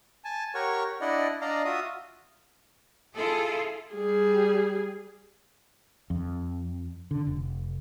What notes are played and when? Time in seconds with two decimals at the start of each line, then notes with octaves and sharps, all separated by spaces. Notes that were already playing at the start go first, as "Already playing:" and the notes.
0.25 G#5 A5
0.55 G4 A#4 C#5 F#5 C#6
1.01 D4 E4 D5 D#5 F#5
1.41 D4 D5 D#5 F5 A#5
1.65 F4 F#4 E5 D#6
3.14 E4 F4 G#4 A4
3.93 G3 G#4
6.10 F2
7.11 D3
7.27 F1